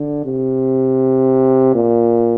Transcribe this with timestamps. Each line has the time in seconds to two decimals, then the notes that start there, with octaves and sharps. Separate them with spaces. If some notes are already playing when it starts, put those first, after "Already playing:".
Already playing: D3
0.25 C3
1.75 A#2